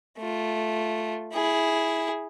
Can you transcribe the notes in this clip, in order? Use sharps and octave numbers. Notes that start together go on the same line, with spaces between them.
A3 F4
E4 G#4